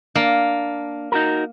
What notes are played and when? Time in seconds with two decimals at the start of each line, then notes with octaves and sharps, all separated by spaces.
0.15 A#3 D4
1.12 D#4 F#4 A#4